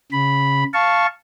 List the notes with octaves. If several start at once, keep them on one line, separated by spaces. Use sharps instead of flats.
C#3 B5
F5 A5 C#6